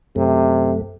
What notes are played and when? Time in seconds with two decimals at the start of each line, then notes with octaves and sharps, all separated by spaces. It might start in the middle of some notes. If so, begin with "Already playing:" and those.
0.16 F#2 C3 A3